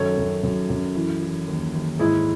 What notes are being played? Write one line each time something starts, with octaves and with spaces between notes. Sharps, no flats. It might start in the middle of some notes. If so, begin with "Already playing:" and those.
Already playing: F#2 D#3 A4 C#5
F#2
F#2
F#2
E3
E3
D#2
D#2
G#2 E4 G#4